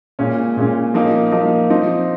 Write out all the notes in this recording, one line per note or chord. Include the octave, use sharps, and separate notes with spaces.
A#2 G#3 C#4
A#2 G#3 C#4
F3 A#3 D#4
F3 A#3 D#4
F3 C4 D#4